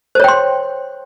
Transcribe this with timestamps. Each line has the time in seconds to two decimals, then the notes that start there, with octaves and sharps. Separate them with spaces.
0.15 C5
0.20 C#5
0.24 G5
0.28 C6